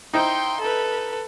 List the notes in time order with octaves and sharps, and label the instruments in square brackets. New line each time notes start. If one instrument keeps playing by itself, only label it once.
[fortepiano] D#4 E4 C5 [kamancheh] G5 C6
[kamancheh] A4 B4